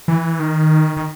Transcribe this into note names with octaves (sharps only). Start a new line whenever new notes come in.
E3
D#3
D#3